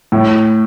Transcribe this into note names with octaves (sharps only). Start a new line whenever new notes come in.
A2